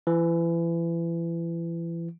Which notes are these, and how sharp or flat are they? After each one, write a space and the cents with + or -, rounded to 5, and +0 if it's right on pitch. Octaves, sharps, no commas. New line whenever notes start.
E3 +30